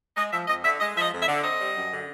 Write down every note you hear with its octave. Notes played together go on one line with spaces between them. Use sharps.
G#3 D#5
F3 E5
F2 D#5
D3 E5
G#3 D#5
F3 E5
D#5
F2
E5
D3
C4 D#5
G3
F#2
D3